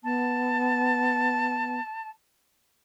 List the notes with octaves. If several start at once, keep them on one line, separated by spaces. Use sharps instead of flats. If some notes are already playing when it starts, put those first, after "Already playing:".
B3 A5